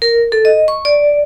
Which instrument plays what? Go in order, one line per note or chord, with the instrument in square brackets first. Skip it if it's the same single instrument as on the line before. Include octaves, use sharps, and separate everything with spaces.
[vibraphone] A#4
A4
D#5
C#6
D5